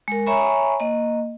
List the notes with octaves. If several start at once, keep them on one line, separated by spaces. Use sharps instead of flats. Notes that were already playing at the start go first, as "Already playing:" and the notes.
G#3 A#4
C#5 E5 G#5 A#5 B5 C#6
A#3 D#5